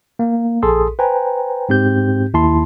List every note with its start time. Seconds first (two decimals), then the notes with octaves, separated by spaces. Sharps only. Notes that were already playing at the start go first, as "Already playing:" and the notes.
0.19 A#3
0.63 A#1 G#4 A4 C6 D#6
0.99 B4 C5 G5 G#5 A#5
1.69 G#2 C4 G4 G6
2.34 D#2 E4 A5 C6